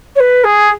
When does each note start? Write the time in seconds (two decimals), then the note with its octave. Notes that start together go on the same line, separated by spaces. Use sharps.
0.16 C#5
0.20 B4
0.44 G#4